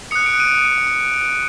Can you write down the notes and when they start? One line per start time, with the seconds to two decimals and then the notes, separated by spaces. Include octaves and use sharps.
0.11 D#6 F#6 C#7
0.26 D7
0.40 D#7